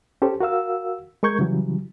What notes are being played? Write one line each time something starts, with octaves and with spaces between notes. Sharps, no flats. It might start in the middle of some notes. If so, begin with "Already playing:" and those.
C#4 G4 A4 C5
F#4 A#4 F5 E6
G#3 A#4 C#6 G6 G#6
C#3 E3 F#3 G3